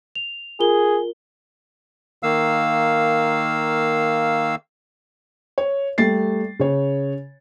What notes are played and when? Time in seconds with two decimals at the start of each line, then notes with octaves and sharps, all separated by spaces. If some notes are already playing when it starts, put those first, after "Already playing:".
0.15 F7
0.60 F4 G#4 A#4 G7
2.23 D#3 A#3 F5 E6
5.58 C#5
5.98 G3 A3 A6 C7
6.60 C#3 C#5